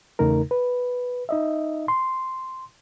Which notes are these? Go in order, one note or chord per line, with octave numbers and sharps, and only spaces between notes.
E2 C#3 A3 D#4 A#4
B4
D#4 D#5 E5
C6